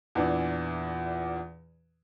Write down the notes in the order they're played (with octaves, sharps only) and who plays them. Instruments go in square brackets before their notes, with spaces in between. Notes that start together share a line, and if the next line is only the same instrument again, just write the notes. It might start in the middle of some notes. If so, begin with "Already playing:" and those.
[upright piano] E2 A#2 E3 D4